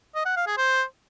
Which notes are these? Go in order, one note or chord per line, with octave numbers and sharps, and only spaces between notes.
D#5
F#5
F5
G#4
C5